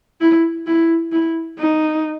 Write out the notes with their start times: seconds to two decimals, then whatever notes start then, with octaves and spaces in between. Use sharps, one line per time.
0.21 E4
0.67 E4
1.12 E4
1.59 D#4